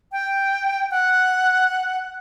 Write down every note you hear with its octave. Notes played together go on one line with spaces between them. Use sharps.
G5
F#5